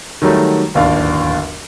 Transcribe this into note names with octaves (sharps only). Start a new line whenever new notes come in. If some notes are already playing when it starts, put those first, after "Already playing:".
D#3 F#3 G3 A3
D1 G1 D#2 D4 F5